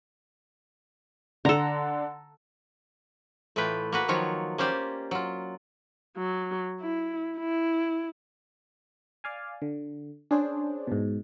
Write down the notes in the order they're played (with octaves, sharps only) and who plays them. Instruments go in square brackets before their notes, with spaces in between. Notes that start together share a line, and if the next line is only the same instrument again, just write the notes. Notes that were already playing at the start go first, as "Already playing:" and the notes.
[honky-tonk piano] D3 [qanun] A4 A#5
[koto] A2 E3 A3 F4 B4 G5
A#3 F#4 B4
D#3 F3 F#3 F4 C#5
A#3 C#4 G4 C5 D5
F#3 F4
[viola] F#3
E4
E4
[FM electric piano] D5 F5 G#5
D3
[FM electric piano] C#4 G#4 C5 [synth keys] D4
[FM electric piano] G#2 B2